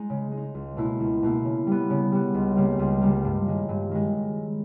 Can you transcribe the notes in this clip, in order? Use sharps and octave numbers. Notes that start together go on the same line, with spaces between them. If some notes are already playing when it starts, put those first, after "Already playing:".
Already playing: G#3 D#4
C#3
G#3
D#4
C#2
B2 A#3 E4
C#2
B2 A#3 E4
C#3
G3 B3
C#3
G3 B3
C#2
C#3 G3 A#3
C#2
C#3 G3 A#3
G2
D#3 G#3
G2
D#3 G#3